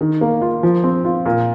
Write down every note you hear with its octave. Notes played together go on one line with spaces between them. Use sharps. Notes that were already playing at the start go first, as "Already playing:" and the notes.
D#3
A#3
F4
F3
C4
F4
A#2